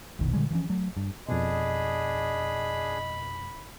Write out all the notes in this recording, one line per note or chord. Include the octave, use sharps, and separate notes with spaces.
F1 A#1 B2 D#3
A#2 D3 G3 G#3
E3 F3 C#4
F#3 A3
G2
F2 B2 D4 G#4 D#5 B5